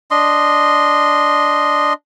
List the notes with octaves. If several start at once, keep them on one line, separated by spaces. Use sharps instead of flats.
D4 D#5 C6